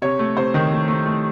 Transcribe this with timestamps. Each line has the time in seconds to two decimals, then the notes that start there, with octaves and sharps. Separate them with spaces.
0.02 C3 C#5
0.19 A3
0.37 C3 C5
0.54 D#3
0.71 A3
0.88 A3
1.06 A3